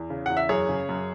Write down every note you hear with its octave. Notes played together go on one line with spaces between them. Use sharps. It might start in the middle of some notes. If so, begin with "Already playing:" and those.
Already playing: E2
C#3
E2 F#5
E5
F#2 G#4 C#5
C#3
F#2